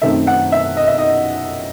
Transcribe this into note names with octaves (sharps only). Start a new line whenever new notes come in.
F#2 D#3 A3 C4 E5
F#5
E5
D#5
E5
D#5